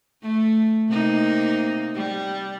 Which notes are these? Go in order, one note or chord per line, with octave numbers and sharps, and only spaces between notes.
A3
C3 A#3 D#4
G3